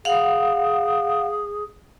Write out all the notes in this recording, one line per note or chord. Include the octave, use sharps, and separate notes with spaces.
G#4 F5 F#5